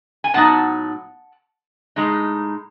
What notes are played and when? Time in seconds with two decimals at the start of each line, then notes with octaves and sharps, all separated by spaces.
0.24 G#5
0.34 A2 F#3 B3 D#4 F#5 A5
1.96 A2 G#3 D#4